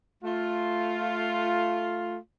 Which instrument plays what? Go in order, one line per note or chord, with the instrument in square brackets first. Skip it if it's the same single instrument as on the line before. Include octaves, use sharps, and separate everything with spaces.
[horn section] A3 F4